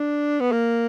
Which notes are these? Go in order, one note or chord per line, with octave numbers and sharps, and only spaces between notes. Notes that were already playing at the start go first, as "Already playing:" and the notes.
Already playing: D4
B3
A#3